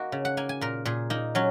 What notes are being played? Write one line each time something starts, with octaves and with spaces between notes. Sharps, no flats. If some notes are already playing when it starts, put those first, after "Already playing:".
Already playing: A#3 D#4 F#4
C#3
F#5
A#3 G#5
G#5
A#2 A#4
A#2 G#4
A#3 D#4
F#3 C#4